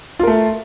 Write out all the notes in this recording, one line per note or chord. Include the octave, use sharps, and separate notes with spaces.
A3 F4 A#4